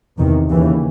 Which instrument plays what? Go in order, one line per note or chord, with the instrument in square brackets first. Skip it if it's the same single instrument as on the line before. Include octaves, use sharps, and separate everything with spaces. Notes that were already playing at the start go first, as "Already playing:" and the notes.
[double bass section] E2 C3 D#3
D#2 C#3 E3